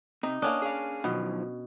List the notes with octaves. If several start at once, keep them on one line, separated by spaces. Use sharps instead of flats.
C3 D#4
A#3 C#4 D4 D#5
G#4 F5
B2 D#3 F3 F#3